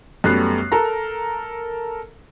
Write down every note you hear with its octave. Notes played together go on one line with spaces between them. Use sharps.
F#2 G3 A3 B3 F#6 C7
A4 A#4 A#5